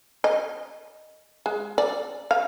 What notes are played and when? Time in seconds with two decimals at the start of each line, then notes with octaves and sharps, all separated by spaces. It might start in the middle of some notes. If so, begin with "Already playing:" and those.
0.24 D#5
1.46 G#3
1.78 D5
2.31 F5